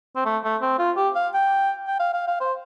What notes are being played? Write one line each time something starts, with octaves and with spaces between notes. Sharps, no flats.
C4
A3
A3
C4
F4
G4
F5
G5
G5
F5
F5
F5
C5